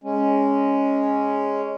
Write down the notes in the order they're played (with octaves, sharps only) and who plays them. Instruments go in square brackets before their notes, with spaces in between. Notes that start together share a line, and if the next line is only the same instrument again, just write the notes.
[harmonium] G#3 C#4